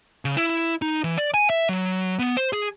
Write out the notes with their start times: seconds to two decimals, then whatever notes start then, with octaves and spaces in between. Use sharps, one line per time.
0.25 C#3
0.37 E4
0.82 D#4
1.04 E3
1.17 D5
1.34 G#5
1.50 E5
1.69 F#3
2.19 B3
2.37 C5
2.53 G#4